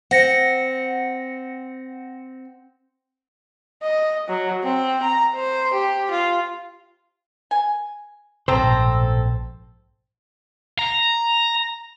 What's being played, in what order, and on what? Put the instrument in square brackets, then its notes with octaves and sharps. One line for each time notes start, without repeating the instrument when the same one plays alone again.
[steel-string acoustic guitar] C4 [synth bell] F#5 A#6 C#7
[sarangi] D#5
F#3
C4
A#5
C5
G4
F4
[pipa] G#5
[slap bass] A#1 G#2 B2 [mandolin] C4 A4 A#5 [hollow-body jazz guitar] C5
[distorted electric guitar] A#5